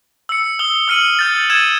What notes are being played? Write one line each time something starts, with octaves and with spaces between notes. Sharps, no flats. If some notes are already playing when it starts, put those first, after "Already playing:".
E6 C#7
D#6 E6 G7
D#6 F6 C#7 D#7 F#7
D#6 G6 A6
E6 G#6 A6 D#7 E7